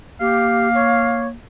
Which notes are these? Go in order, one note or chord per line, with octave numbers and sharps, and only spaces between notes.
A#3 G4 F5
C#5